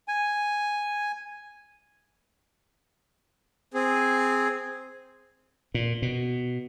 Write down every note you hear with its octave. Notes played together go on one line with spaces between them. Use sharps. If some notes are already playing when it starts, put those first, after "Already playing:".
G#5
C4 G#4
A#2
B2